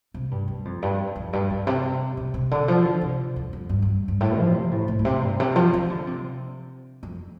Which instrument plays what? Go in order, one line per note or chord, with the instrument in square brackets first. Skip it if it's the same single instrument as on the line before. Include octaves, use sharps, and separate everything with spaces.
[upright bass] C3
G2
G2
F2
G2
F2
G2
G2
C3
C3
C3
D3
F3
D3
C3
F2
F2
G2
G2
G2
A2
F3
C3
A2
A2
A2
C3
G2
C3
F3
F3
D3
C3
F2